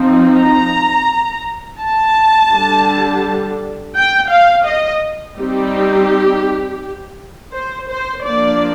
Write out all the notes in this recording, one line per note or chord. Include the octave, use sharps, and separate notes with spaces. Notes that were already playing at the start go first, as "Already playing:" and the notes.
Already playing: F3 C4 D#4
A#5
A5
D3 G3 D4
G5
F5
D#5
G3 C4 D#4 G4
C5
C5
F3 A#3 D4 D5